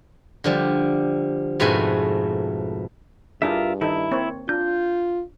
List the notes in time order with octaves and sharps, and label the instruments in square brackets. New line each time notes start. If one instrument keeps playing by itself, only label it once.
[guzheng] D3 F3 G3
F2 G#2 B2 A3 B4 G#5
[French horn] G2 [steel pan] D4 E4 G#4 [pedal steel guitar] F4 A#4 E5
[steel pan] D#3 D#4 A4 [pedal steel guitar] E4
[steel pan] A#3 C4 C#5
[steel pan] D4 [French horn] F4 [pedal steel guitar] G6